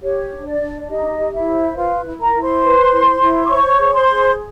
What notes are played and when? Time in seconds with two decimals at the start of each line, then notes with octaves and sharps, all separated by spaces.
0.02 G4 C#5
0.32 D4
0.46 D5
0.61 D4
0.81 D5
0.89 D#4 G4 D#5
1.18 G4
1.33 E4 E5
1.47 C5
1.76 F4 B4 F5
2.05 E4
2.20 A#4 A#5
2.34 E4
2.41 C5 C6
2.63 B4
2.92 E4
3.21 E4
3.46 D6
3.50 C5 C#5 C#6
3.79 G#4
3.94 C5 C6
4.08 G#4